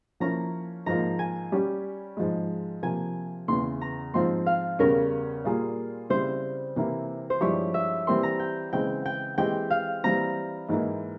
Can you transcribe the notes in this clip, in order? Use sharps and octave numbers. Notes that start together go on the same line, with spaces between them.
F3 A#3 C#4 E4 A#5
G#2 F3 A#3 F4 A#5
G#5
G3 C#4 G4
G#2 F3 G#3
C3 F3 A#3 G#5
E2 C#3 E3 C6
A#5
G#2 F3 C4 F4 C6
F5
E2 C#3 G3 C#4 A#4
A#2 G3 A#3 F4 G#4
C#3 G3 C4 E4 C5
C3 E3 A#3 E4
C5
G2 F3 G#3 E4 G4 C#5
E5
E3 G3 C4 G4 A#4 C6
A#5
G5
C#3 E3 G#3 C4 G5
G5
E3 G#3 C4 G4 C5 G5
F5
E3 G3 C4 A#5
G#2 E3 A#3 E4